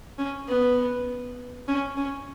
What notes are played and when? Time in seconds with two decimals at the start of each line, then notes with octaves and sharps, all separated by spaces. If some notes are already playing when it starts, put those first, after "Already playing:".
0.18 C#4
0.48 B3
1.68 C#4
1.97 C#4